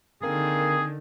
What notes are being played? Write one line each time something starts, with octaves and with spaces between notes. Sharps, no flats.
D3 D#3 A#3 C4 G#4